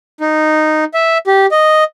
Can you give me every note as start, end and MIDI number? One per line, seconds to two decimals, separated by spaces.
0.21 0.84 63
0.94 1.18 76
1.27 1.46 67
1.52 1.84 75